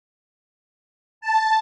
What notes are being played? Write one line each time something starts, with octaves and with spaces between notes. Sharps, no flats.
A5